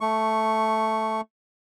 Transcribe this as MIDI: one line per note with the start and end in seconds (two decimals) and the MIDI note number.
0.01 1.21 57
0.01 1.21 85